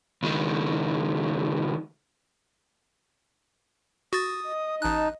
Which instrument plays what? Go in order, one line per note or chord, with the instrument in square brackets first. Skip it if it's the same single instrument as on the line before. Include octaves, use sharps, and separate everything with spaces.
[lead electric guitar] C#2 D#3
[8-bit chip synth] F#4 A6 [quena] D#6
[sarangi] D#5
[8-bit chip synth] A1 F#6 [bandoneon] D#4 [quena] A5